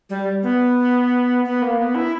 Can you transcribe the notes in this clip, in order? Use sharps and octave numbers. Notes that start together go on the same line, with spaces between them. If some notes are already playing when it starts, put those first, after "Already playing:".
G3
B3
B3
A#3
B3
E4